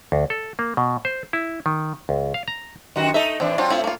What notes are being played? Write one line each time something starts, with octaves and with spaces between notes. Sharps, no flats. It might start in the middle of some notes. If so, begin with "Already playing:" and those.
D2
A4
A#3
B2
C5
E4
D#3
C#2
F5
A#5
F#2 D#3 F#4
A3 D#4 A4 D#5 E5
A2 E3 C4 D4
F#3 C4 D4 F4
A2 A3 C4 E4 F4
A#3 F4